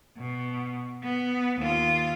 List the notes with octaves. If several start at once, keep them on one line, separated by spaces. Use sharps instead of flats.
B2
B3
D#2 F4